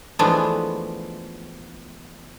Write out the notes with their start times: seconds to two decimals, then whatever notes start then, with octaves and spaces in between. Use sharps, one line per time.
0.19 E3 F3 G#3 A3 B3 D4